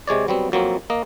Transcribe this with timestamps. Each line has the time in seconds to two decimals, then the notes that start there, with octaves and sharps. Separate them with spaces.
0.07 C3 G#3 C#5 D5
0.28 F#3 G3 B3 C4
0.52 F2 F#3 A#3 C4
0.90 A#3 D#5